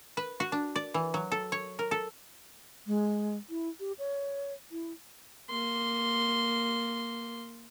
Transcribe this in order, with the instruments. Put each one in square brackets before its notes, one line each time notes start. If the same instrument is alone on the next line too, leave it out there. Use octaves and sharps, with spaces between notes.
[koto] B4
F#4
D4
D5
E3
F#3
A4
C#5
A#4
A4
[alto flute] G#3
E4
G4
C#5
E4
[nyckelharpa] A#3 C6